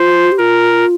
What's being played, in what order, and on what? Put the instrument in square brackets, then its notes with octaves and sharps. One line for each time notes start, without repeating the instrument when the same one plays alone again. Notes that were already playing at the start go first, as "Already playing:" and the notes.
Already playing: [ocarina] F4 [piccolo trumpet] C5
[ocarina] G4
[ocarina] F4 [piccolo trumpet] A#4